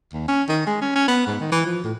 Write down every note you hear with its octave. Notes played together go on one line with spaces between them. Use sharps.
D#2
C#4
D#3
G#3
C#4
C#4
B3
G#2
D#3
E3
F3
A2